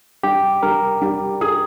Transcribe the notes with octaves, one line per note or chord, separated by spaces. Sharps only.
G3 G4
G3 A#4
G3
G#4